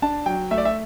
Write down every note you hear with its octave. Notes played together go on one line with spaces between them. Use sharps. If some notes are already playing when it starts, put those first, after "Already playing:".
D4 A5
F#3 G5
A3 E5
D5
E5